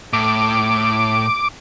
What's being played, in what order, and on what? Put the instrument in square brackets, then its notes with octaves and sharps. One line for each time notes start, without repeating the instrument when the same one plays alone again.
[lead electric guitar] A2 [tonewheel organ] D6